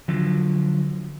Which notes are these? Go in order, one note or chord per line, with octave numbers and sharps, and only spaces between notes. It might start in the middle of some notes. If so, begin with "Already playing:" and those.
D3 F3 F#3